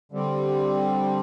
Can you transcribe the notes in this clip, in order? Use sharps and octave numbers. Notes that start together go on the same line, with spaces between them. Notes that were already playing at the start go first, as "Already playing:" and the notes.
D3 G3 C4